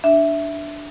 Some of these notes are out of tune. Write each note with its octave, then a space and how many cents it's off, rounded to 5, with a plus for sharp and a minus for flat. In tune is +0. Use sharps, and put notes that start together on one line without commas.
D4 +0 E5 +0